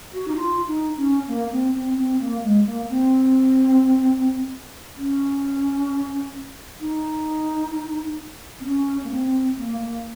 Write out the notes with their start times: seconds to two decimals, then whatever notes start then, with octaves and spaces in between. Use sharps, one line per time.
0.13 F#4
0.27 D#4
0.36 F4
0.67 D#4
0.97 C#4
1.28 A#3
1.51 C4
1.74 C4
1.97 C4
2.20 A#3
2.43 G#3
2.66 A#3
2.89 C4
4.96 C#4
6.80 D#4
8.60 C4
8.65 C#4
9.04 A#3
9.11 C4
9.58 A#3
9.80 A#3